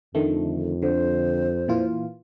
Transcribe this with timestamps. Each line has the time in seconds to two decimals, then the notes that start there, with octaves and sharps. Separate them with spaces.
0.15 F2 D3 D#3 A3
0.82 D3 C5
1.68 A#2 E3 F4